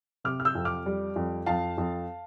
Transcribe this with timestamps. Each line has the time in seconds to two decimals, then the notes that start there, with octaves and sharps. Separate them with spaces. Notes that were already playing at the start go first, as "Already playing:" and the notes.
0.24 C3 D6 F6
0.40 F6
0.45 E6 G6
0.55 F2
0.65 D6 F6
0.86 G3
1.16 F2
1.46 F2 F5 A5
1.78 F2